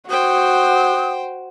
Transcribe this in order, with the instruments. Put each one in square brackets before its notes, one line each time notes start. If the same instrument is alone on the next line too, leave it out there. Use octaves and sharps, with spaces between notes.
[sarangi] F#4 [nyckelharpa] C5 G5 [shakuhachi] D#6